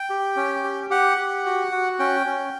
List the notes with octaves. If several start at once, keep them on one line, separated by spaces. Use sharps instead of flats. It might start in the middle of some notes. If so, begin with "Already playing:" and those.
Already playing: G5
G4
C#4
G4
G4 F#5
G4
F#4
F#4
C#4 G5
C#4